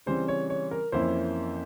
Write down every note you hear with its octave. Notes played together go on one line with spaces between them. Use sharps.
C#3 E3 G3 C4 C5
C#5
C#5
A#4
F2 E3 A#3 C#4 E4 C5